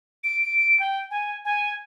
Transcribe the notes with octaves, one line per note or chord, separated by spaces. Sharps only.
D7
G5
G#5
G#5